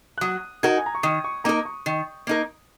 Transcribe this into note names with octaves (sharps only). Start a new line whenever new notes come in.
F#6
F#3 D#6
D#4 F#4 A#4 G#6
G#5
A#5
C#6
D#3 D#6
C#6
A#3 D#4 A#4 A#5
C#6
D#3
A#3 D#4 A#4